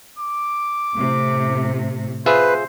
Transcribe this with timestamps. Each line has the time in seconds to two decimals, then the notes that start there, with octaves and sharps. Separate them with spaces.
0.19 D6
0.94 A2 C3
2.26 F4 G#4 B4 C5 E5